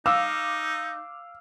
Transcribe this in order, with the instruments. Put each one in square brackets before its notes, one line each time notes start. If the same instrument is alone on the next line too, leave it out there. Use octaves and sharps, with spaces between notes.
[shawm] D#4 [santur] F5 [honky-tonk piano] D6 [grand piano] E6